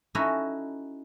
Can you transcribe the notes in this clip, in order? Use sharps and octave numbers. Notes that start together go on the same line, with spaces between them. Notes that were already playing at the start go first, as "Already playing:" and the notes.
C#4 D#4 E4 F#4 A4 D#5